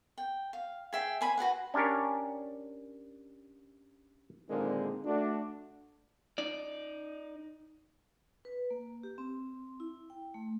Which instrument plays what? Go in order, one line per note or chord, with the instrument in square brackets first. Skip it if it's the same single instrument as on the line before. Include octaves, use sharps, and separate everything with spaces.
[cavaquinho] G5
F5
G#4 E5 G5
C5 G#5 B5
F#4 G#4 B4 F#5
[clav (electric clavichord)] C#4 D4 G4 A#4 C#5
[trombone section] A#2 D3 D#3 G#3 A#3 C4
A3 D4 F#4
[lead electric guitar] D#4 D5
[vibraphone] B4
A#3
G4
C4
E4
G5
A3